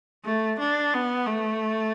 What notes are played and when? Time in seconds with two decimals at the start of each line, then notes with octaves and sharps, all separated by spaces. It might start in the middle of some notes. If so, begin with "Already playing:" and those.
0.25 A3
0.59 D4
0.93 B3
1.26 A3